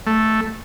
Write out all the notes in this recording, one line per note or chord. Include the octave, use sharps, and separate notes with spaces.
A3